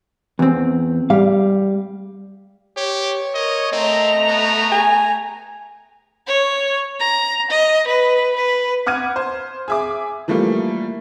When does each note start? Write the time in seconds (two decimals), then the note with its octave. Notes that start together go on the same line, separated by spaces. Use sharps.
0.39 E2 C4
1.10 G3 F5
2.77 G4 C#5
3.34 A#4 D#5
3.73 A3 C4 D#5 A#5
4.27 B3
4.72 G#5
6.27 C#5
7.00 A#5
7.50 D#5
7.87 B4
8.36 B4
8.86 F#5 D6 F6 G#6 D#7
9.16 C5
9.68 G#4 E5 D6
10.28 E3 F3 G3 A3 A#3 F4